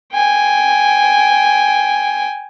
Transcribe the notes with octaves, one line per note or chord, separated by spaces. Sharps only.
G5 G#5